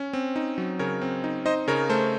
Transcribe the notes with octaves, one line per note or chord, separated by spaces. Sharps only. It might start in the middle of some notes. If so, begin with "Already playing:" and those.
Already playing: C#4
C4
D#4
F#3
C#3 A#4 C#5
C4
D#4
D#4 C5 D#5
C#3 A#4 C#5
A3 A4 C5